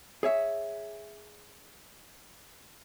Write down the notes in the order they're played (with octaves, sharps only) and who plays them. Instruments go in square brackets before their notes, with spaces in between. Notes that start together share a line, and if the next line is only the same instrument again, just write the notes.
[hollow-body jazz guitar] G#4 C#5 E5